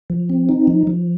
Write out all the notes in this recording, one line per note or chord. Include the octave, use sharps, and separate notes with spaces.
F3
C4
D#4
F3
F3